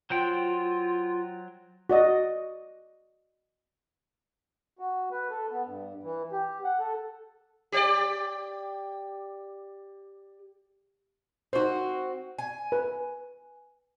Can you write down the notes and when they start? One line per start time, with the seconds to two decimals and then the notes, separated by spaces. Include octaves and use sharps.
0.10 F#3 F4 C5 G5
1.89 F#4 D5 D#5
4.79 F#4
5.11 B4
5.31 A4
5.51 B3
5.65 G2
6.03 E3
6.32 G4
6.64 F#5
6.79 A4
7.72 G4 C#5 D5
11.53 C4 D#4 F#4 C5
12.39 G#5
12.72 B4